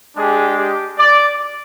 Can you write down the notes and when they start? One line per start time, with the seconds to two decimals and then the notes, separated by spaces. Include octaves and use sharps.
0.16 G#3 D4 G4 G#4
0.57 G4
0.98 D5